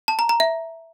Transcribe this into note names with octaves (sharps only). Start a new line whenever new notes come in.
A5
A#5
A#5
E5